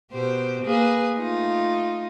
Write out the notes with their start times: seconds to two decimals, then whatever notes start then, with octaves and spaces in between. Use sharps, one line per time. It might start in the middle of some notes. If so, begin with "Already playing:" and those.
0.12 B2 G4 C5
0.63 A#3 G#4 B4
1.15 A3 D#4 F4